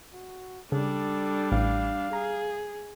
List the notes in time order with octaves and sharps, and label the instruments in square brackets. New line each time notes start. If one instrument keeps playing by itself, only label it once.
[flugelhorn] F#4
[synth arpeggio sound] C#3 [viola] G3 D4 [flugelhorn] A4
[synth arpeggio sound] A1 [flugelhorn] F5
[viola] G#4 [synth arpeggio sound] A#5